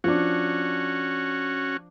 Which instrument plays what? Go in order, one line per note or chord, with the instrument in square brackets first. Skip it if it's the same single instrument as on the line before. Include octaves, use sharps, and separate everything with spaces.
[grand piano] F3 D4 [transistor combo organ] C#4 F#4